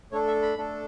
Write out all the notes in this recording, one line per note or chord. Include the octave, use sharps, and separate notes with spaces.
A3 D4 A4 C#5
E5
B5
A3 D4 A4